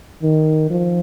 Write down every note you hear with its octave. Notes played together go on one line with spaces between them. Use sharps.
D#3
F3